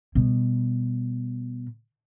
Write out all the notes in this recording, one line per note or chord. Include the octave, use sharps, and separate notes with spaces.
B2 G3